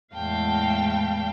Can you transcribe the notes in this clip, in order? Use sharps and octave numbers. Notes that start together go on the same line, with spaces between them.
E2 A2 G#3 F5 G5 A5